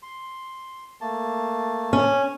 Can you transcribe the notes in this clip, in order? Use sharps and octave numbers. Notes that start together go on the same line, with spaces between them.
C6
A3 A#3 A5
C#4